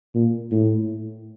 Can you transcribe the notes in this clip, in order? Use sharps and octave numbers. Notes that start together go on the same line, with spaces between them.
A#2
A2